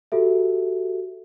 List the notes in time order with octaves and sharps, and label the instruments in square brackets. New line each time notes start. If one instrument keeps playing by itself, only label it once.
[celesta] F#4 G4 A4 E5